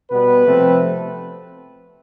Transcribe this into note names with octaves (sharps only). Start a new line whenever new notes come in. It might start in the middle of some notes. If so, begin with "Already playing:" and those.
B2 G3 B3 B4
C3 F3 A3 C4